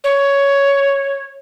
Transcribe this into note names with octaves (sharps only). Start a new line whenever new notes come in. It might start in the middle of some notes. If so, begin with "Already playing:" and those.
C#5